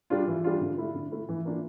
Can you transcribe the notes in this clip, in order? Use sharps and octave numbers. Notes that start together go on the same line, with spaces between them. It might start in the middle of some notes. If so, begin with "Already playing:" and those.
G3 D4 F4
E3
G3 D4 F4
D3
A3 E4
D3
A3 E4
E3
A#3 D4 F4